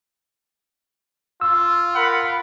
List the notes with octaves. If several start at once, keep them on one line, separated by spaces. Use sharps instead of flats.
F4 E6
A#4 F#5 B5